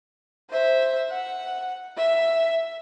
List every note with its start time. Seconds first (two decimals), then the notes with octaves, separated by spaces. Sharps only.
0.50 C5 E5
1.11 F#5
1.97 E5